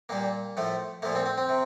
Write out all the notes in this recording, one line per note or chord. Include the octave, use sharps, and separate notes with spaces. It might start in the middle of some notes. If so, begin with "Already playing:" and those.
A#2 G3 A#3
A2 F3 A3
A#2 F3 A3 A#3
C4
C4
C4
C3